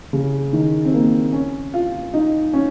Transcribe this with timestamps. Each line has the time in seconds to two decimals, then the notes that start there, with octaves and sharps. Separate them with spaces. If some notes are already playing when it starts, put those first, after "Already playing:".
0.13 C#3
0.53 D#3
0.85 C4
0.94 A#3
1.33 C#4
1.74 F4
2.14 D#4
2.53 C#4